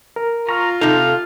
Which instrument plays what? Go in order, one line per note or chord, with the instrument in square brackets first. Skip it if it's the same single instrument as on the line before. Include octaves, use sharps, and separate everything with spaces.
[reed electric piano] A#4
[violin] F4 [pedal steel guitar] A#5 [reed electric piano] C#6 F6
[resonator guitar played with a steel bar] C3 D#4 [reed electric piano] A4 [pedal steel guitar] F5